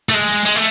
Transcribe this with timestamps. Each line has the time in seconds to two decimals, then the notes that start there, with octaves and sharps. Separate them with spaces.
0.09 A3
0.14 G#3
0.45 G#3
0.55 A3